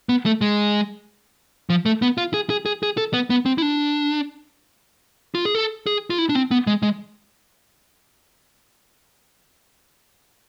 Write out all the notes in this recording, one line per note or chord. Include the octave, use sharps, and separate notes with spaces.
B3
A3
G#3
F3
A3
B3
F4
G#4
G#4
G#4
G#4
A4
B3
B3
C4
E4
D4
F4
G#4
A4
G#4
F4
E4
D4
C4
B3
G#3
G#3